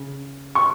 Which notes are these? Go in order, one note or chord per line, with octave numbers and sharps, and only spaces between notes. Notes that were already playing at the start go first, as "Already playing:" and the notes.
Already playing: C#3
C#6